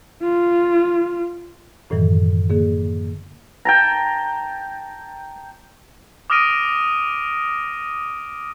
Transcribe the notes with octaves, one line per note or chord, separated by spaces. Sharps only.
F4
F#2 A2 D#3 E3 F#3
D3 A#3 G#4
G5 A5 A#5
D6 D#6 F6 A#6 D7 D#7